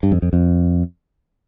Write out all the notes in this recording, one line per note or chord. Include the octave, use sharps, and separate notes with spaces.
G2
F2
F2
F2